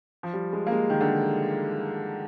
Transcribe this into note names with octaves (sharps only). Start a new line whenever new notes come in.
F3
G3
G#3
A#3
G#3
D#3
D3